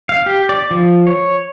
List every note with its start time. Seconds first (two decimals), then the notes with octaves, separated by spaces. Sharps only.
0.09 F5
0.26 G4
0.49 D5
0.71 F3
1.07 C#5